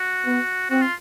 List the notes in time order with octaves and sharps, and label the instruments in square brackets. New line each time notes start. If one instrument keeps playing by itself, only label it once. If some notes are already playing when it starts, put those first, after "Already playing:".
Already playing: [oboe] F#4
[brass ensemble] B3
[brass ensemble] C4 [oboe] F#4
[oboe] F4